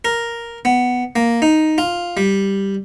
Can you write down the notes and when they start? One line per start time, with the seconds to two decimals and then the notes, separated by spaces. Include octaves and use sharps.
0.05 A#4
0.65 B3
1.16 A#3
1.42 D#4
1.78 F4
2.17 G3